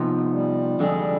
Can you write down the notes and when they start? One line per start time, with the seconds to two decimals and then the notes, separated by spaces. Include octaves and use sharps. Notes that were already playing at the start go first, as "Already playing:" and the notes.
Already playing: C3 F3 B3 D#4
0.32 G3
0.79 F2 D3 G#3 D4 G#4